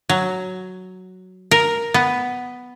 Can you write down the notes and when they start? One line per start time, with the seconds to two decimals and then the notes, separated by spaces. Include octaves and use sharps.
0.09 F#3
1.51 A#4
1.94 B3